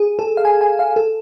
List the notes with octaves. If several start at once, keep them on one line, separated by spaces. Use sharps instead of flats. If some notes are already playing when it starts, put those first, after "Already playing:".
Already playing: G#4
A4
F5
G#5
G#5
F5
A4